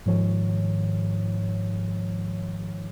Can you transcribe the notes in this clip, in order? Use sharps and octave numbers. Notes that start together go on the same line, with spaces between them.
G#2 D#3 F3 C#5